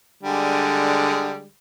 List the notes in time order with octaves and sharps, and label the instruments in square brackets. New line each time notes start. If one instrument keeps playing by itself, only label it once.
[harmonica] D3 G3 G#3